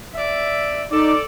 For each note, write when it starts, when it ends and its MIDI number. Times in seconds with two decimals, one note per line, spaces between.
0.14 0.82 74
0.14 0.82 76
0.91 1.12 63
0.91 1.22 69
0.91 1.22 74